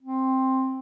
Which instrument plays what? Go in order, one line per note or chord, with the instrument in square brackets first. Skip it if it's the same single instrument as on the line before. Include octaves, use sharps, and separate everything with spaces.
[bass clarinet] C4